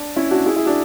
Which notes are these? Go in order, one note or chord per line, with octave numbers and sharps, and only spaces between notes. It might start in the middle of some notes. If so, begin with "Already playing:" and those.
Already playing: D4
C#4 E4
D4 F#4
E4 G#4
E4 G#4
D4 F#4